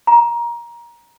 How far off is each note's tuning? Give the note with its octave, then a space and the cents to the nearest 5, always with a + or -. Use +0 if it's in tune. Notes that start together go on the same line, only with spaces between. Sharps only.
A#5 +20